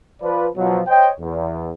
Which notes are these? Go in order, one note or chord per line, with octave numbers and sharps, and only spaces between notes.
F3 B4 D5
B2 F3 F#3
C5 C#5 D#5 G5
E2